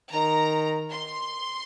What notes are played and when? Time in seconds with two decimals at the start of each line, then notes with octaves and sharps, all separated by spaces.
0.13 D#3 A#5
0.92 C6